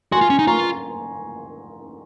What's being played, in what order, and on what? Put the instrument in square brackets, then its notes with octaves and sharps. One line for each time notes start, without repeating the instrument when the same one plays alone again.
[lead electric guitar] F#4 [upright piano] G#5 C6
[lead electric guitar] F4
C#4
D#4
[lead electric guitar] F4 [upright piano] A#5 C#6